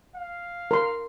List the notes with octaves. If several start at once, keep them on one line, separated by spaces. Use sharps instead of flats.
F5
A#4 C6